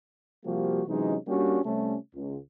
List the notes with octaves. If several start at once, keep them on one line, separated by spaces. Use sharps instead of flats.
C3 F3 G3 A#3 F#4 G4
C3 E3 F#3 G#3 C#4 D#4
G3 A#3 C#4 D4 F#4 G4
C3 G3 A3 C#4
C#2